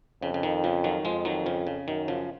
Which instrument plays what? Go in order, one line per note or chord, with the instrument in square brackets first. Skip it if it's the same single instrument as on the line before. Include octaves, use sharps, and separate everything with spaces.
[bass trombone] F2 [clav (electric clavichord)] C#3
[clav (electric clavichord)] C#3
D#3
C#3 F3
D#3 F#3
[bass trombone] F2 [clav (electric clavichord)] F3 G#3
[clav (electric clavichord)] D#3 F#3
C#3 F3
C#3
[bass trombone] F#2 [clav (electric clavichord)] D#3
[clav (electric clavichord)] C#3 F3